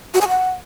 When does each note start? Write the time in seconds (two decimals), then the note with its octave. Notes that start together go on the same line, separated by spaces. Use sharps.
0.14 F#4
0.21 G#5
0.28 F#5